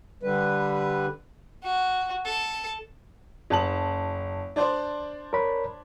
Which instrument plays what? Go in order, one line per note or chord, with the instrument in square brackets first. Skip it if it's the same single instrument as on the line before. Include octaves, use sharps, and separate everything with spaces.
[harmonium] D3 G3 B4
[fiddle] F#4
A4
[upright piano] F#1 A5 F#7
D4 C5 D5
[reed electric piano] A#4 C#5 B5